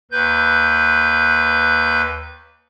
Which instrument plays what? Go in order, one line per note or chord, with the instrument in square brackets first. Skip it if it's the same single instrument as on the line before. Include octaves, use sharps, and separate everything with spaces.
[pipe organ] D#2 B4 G6